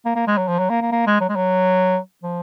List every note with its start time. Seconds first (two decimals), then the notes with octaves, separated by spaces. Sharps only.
0.06 A#3
0.16 A#3
0.27 G#3
0.38 F#3
0.48 F3
0.59 F#3
0.70 A#3
0.82 A#3
0.92 A#3
1.07 G#3
1.21 F#3
1.29 G#3
1.36 F#3
2.23 F3